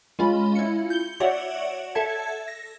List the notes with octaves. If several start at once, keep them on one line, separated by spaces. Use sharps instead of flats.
G#3 C#4 F4 B5
E4 C#7
G6 G7
F#4 C#5 D5 E5 F#5
A4 E5 A5 G#6
A#6